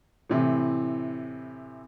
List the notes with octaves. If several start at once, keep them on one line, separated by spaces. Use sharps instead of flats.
A2 C3 E3